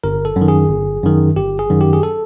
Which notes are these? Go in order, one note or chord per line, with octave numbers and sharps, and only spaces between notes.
G1 A#4
A4
F#2
D#3
G#4
G1
F#2 D#3
G1 G4
G#4
F#2 D#3
G4
G#4
A4